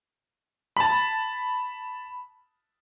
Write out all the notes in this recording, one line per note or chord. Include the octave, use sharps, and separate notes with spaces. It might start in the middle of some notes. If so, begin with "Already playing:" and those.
A5 B5